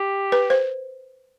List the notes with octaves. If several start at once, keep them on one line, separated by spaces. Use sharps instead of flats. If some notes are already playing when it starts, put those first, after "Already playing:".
Already playing: G4
B4
C5